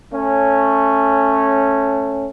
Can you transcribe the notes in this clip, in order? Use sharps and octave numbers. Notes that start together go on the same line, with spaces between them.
A3 C#4